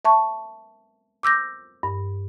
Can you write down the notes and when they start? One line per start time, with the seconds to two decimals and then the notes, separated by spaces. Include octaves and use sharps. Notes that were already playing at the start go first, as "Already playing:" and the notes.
0.05 E5 A5 C#6
1.23 D6 E6 G6 A#6
1.83 G2